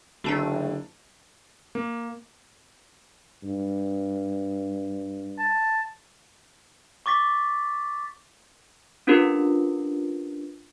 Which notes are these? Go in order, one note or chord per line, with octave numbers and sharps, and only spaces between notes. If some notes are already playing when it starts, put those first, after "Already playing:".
F#1 D3 A3 F#4 A5 A#5
A#3
G2
A5
C#6 D6 A6 B6
C#4 D4 F4 G4 A#4 B4